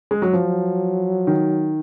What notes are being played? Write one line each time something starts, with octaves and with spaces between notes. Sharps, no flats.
G#3
F#3
F3 F#3
D#3